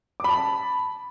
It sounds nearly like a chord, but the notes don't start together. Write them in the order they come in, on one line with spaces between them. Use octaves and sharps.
D6 B5 A5